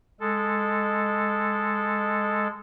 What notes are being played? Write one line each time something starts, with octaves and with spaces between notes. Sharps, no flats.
G#3 A4